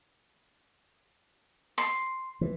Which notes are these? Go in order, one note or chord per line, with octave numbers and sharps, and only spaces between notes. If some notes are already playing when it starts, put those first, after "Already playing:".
C6
E3